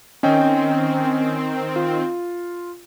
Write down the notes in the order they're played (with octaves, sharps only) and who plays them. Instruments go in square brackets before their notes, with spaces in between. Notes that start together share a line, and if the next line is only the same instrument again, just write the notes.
[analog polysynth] D#3 C4 [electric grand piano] C#4 D#5 G5
[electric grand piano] F4